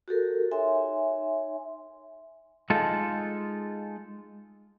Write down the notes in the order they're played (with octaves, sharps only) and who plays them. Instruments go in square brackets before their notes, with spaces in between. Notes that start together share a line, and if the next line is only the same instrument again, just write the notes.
[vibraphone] F#4 G4 A4 A#4
D#4 C#5 E5 G#5 C6
[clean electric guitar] G#3 D#4 F4 A4